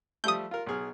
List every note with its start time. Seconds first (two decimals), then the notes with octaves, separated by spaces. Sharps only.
0.24 F3 G3 A3 D#6 G6
0.51 F4 A#4
0.66 B1 G#4 F6